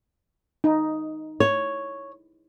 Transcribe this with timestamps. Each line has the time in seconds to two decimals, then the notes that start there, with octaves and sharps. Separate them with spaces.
0.64 D#4
1.40 C#5